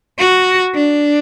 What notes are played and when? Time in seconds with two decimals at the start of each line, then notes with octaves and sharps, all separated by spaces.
0.19 F#4
0.75 D4